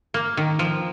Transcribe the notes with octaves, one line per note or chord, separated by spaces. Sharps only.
A#3
D#3
F3